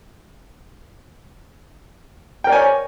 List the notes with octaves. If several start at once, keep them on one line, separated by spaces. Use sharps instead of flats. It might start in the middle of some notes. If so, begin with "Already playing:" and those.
A#4 C#5 D5 G5 G#5